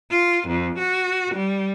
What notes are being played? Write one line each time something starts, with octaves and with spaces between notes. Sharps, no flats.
F4
F2
F#4
G3